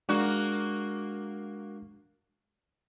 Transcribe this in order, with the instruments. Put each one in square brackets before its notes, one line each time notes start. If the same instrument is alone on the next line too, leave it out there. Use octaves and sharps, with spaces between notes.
[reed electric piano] G#3 D4 [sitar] A#3 F#4